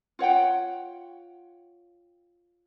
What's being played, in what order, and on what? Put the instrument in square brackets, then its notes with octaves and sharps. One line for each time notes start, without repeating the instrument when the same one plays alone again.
[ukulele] F4 C#5 F#5 G5